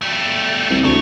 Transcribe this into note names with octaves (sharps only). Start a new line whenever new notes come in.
G3 A3
C2
D2 F#3 C#5